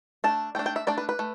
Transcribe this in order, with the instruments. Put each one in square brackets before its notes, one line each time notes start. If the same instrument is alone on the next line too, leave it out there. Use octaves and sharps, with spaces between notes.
[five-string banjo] A3 D4 A5
A3 D4 G5
G5
E5
A3 D4 D5
B4
B4
A3